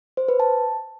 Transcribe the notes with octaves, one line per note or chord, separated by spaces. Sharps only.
C5
B4
A5